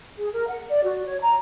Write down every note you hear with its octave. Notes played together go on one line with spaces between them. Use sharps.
G#4
A#4
F#5
D5
F#4
C#5
A#5